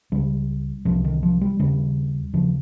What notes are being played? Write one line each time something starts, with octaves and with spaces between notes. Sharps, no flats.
C#2 C#3 G3
C2 C3 F3
D#3
F3
G3
D#2 C#3 G3
D#2 C#3 F3